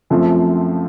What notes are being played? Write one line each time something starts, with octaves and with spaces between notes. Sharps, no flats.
F#2 F3 A3 C4 F4